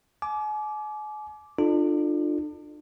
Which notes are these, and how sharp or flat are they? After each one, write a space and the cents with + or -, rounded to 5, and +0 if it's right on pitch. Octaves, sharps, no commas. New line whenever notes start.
G#5 +40 D6 -5
D4 +35 F4 +0 A4 -10